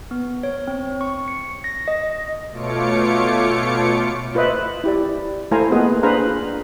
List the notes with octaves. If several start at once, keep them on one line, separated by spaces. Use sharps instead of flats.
B3
C#5
C4
C#6
C#7
A#6
D#5
B2 A3 F4 C#5 D6 C#7
F4 B4 C5 D#5 E5
E4 G4 D5
A3 E4 C5 F5 G#5 A#5
A#3 B3 F4 G#4 B4 D#5
D4 G#4 B4 C5 F5 A#5
F4